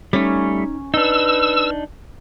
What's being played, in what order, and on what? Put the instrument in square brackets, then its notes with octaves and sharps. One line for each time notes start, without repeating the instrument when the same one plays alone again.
[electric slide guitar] G3 A3 [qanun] C#4 [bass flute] D#4
[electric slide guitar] D4 D#4 [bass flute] B4 [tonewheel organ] E6